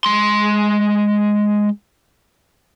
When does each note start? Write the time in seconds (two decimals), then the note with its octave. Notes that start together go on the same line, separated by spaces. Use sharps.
0.05 G#3 C6